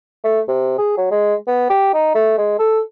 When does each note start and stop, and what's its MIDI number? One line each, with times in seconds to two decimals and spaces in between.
0.24 0.41 57
0.48 0.75 48
0.78 0.97 68
0.97 1.10 54
1.11 1.34 56
1.47 1.69 59
1.70 1.91 67
1.94 2.14 63
2.15 2.37 57
2.38 2.56 56
2.59 2.80 69